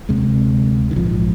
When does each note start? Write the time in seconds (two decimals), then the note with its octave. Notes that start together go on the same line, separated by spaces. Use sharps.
0.09 D2 C3 G#3
0.91 D#3
0.96 A#1 G#2 F3